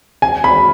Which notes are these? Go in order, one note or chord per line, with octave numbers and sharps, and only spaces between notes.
G#5
B5